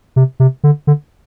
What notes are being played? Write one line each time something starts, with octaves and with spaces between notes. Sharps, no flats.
C3
C3
D3
D3